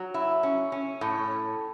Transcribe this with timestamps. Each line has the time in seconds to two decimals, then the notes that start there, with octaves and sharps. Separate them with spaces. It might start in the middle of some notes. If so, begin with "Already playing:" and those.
Already playing: F#3
0.14 E4
0.43 C#4
0.72 C#4
1.01 A2